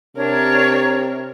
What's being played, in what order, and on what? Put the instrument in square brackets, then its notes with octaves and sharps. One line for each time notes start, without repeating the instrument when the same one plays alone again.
[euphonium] C3 [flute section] D4 C#5 [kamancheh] A#4